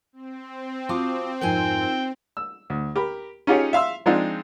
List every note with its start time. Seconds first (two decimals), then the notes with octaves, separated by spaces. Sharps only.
0.13 C4
0.89 F4 F#4 F5 A5 D6 D#6
1.41 F2 G#2 D#4 F4 A#4 G5 G#5
2.37 E6
2.70 D2
2.96 G4 A#4 B5
3.47 C#4 D#4 F4 G4 G#4 C#5
3.73 E5 F5 C6 E6
4.06 F3 G#3 C4 D4 D#4 F4